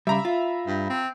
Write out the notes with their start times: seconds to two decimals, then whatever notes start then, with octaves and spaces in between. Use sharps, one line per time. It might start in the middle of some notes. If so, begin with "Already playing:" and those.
0.07 C#3 G3 E5 A#5 B5
0.25 F4
0.67 G2
0.89 C4